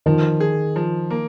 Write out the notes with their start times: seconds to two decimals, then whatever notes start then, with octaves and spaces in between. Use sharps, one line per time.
0.06 D#3 F3
0.40 G#4
0.76 F3
1.10 A#3